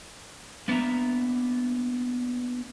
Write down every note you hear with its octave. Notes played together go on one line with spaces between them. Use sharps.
A#3 B3 D4 E5 A#5